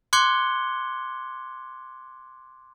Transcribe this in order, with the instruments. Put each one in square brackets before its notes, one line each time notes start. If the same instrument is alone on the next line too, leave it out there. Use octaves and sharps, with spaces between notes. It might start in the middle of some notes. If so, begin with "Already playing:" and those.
[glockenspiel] C6 D6 F#6 G#6 C#7 G7